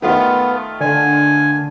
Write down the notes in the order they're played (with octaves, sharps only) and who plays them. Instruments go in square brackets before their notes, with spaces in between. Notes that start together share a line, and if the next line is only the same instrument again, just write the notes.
[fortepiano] D#3 A3 F4 [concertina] B3
[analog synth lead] D3 [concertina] G#5